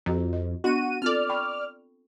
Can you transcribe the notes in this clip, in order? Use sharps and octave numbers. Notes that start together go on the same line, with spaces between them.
F2 F#4 D#5 A#5
D#5
B3 D4 F#4 D#5 D#7
C4 F4 A4 D5 F6
G5 B5 C#6